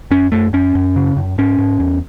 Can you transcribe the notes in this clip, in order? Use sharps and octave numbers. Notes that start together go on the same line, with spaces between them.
F#2 C#4
F#2 A3
F#2 C#4
F#2
C#3
F#2
G#2 C#4
G#2
E2